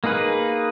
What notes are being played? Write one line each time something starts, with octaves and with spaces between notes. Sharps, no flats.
A#3 D#4 G#4 B4